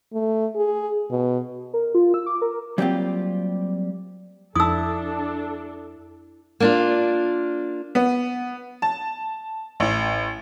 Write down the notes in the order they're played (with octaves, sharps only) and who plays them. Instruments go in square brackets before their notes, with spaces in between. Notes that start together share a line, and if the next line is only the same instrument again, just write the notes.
[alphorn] A3
G#4
B2
[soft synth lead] A#4
F4
E6
D6
A#4
[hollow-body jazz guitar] F#3 G3 A#3 C4 F4 G4
[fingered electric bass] F2 [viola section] D4 A4 [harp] E4 A5 [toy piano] D#6 E6
[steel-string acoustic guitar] A#3 D4 F4
[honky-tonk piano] B3
A5
A1